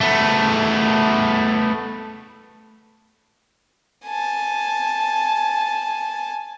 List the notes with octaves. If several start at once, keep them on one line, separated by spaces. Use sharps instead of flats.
A3 B3
G#5 A5